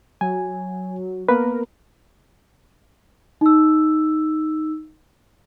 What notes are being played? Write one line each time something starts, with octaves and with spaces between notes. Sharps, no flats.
F#3 G#5
A#3 B3 A#4 B4
D#4 E6